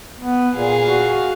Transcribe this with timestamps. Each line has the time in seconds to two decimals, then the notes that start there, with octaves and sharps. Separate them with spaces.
0.19 B3
0.55 A#2 G#4 F5
0.85 F#4